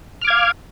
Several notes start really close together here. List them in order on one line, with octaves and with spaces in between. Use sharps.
F6 D6 G#6 F5